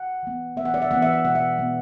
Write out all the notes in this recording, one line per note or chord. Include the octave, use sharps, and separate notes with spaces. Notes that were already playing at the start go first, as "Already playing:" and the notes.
Already playing: F#5
E3 B3
E3 B3 E5
F#5
D5
E5
E3 B3 F#5
E5
E5
B2 G#3 B3 F#5
E5
B2 G#3 B3